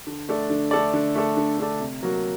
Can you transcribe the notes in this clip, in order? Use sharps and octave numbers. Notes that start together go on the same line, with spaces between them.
D3
A3 D4 A4 D5
D3
A3 D4 A4 D5
D3
A3 D4 A4 D5
D3
A3 D4 A4 D5
C3
F#3 A#3 F#4